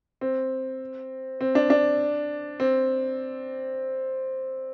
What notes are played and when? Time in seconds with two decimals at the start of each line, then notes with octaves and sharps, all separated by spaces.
0.21 C4
1.41 C4
1.55 D4
1.70 D4
2.60 C4